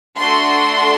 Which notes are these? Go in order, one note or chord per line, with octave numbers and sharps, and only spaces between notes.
A3 D4 F#4 A4 C6